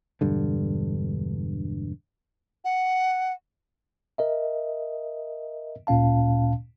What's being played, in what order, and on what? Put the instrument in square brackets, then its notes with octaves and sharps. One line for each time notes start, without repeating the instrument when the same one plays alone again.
[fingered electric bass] E1 G2 D3
[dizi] F#5
[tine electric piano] A#4 D#5 E5
D2 A#2 C#4 F5 A5